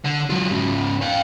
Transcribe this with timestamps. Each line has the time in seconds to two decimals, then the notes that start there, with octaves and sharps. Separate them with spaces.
0.04 D3
0.30 F#3 F4
0.51 G#2 C#3
1.02 F5 G5